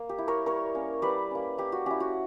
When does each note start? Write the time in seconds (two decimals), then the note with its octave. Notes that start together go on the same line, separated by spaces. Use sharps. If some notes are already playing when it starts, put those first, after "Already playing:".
Already playing: A#3
0.09 G4
0.18 E4
0.28 A#4 C#5
0.46 G3 A#4 C#5
0.75 A#3 C#4
1.02 G3 B4 D5
1.31 A#3 C#4
1.58 A#3 G4
1.72 F#4
1.86 C#4 E4 G4
2.00 F#4